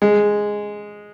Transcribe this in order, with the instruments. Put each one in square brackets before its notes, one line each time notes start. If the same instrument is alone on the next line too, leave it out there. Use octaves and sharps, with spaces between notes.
[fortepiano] G#3